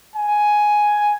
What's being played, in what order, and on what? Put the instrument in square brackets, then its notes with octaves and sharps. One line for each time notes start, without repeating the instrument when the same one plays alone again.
[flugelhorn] G#5